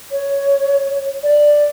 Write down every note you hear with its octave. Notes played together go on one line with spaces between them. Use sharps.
C#5
D5